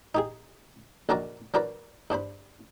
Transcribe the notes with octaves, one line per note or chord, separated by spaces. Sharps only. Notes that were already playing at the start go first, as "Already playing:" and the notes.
D#4 G4 G#4
A#1 D#3 D4 F#4 A#4 D5
F#3 D4 A#4 B4 D5
G2 D4 C5 B5